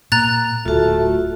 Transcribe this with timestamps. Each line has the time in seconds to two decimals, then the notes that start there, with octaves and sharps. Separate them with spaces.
0.12 A#2 A#5 F#6 A6
0.66 D1 A3 F4 F#4